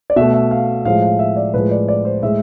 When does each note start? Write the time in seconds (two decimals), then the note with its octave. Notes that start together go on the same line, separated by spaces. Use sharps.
0.10 D5
0.16 B2 A3 E5
0.33 E5
0.51 F5
0.85 A2 F3 G#3 F5
1.02 F5
1.19 E5
1.37 D5
1.54 A2 F3 G#3 B4
1.71 D5
1.88 D5
2.05 C5
2.23 A2 G#3 E5